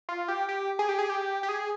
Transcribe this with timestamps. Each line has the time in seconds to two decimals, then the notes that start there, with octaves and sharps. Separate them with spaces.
0.09 F4
0.28 G4
0.49 G4
0.79 G#4
0.89 G4
0.99 G#4
1.10 G4
1.43 G4
1.49 G#4